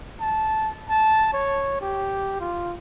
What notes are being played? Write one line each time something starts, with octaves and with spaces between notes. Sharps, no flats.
A5
A5
C#5
G4
F4